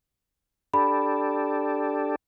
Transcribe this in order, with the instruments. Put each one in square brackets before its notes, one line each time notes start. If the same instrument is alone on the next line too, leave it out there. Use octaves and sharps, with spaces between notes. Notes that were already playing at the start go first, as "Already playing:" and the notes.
[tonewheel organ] D4 G4 A4 [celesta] B5